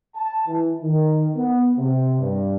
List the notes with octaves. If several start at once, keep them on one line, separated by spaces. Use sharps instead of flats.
A5
E3
D#3
B3
C3
G2